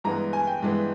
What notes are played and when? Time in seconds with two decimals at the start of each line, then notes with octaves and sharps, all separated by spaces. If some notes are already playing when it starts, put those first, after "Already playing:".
0.04 G2 E3 G#3 B3 A#5
0.33 G#5
0.47 G5
0.62 G2 E3 G#3 B3